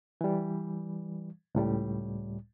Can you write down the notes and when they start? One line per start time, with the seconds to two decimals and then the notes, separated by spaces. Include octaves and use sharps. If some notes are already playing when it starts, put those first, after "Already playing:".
0.21 E3 G3
1.55 C#2 A2 G3